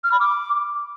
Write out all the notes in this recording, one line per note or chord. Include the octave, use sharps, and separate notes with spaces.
F6
B5
D6